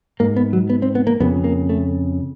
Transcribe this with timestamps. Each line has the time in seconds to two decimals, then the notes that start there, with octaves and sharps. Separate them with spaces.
0.20 G#2 A#3
0.36 B3
0.53 F#3
0.70 B3
0.82 C4
0.95 B3
1.07 A#3
1.20 F2 C#3 B3
1.44 A#3
1.69 A3